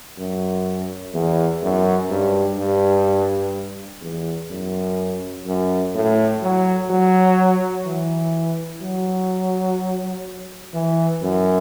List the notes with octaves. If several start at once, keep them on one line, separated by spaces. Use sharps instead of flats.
F#2
E2
F#2
G2
G2
E2
F#2
F#2
A2
F#3
F#3
E3
F#3
E3
F#2